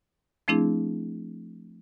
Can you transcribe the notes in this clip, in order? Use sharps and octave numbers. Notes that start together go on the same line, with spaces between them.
F3 A3 C4 D4 E4 G#4